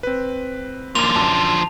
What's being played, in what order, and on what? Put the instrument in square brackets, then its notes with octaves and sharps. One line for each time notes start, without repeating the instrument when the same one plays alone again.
[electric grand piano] C4 B4
[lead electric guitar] D3 F3 [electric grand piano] A#3 [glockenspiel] F7
[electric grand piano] F#2 [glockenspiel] A5